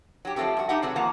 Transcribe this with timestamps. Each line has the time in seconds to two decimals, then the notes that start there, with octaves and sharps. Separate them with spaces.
0.25 F#3 G4
0.36 F3 F#3 A3 A#3 C4 G4
0.57 G2 F#4
0.69 D#4 G4 E5 F#5
0.82 C3 F#3 A3 C4 G#4 B4
0.96 E2 F3 A#3 F#5 A#5